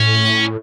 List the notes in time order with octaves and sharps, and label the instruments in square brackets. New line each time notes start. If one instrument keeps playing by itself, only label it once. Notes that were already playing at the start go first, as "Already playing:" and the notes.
Already playing: [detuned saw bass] A2 [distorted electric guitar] C#4